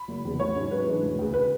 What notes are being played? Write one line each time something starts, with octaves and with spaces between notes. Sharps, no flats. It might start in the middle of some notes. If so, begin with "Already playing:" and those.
Already playing: B5
F#1
E2 C#3
A1 C#5
G#2 F#3 C#4
G#2 B4
E3 G#3 D4
E1
D2 C#3
B4